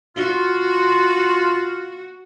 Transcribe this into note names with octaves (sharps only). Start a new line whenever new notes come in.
F4 F#4